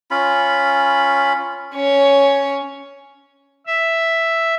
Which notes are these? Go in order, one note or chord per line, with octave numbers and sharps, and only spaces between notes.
C#4 F4 B5
C#4 C#5
E5